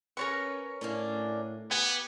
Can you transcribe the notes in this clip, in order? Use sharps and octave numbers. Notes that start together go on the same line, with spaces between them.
C#4 A#4 B4 C#5 C#6
A2 A#3 C#4 D4
B3 G4 G#5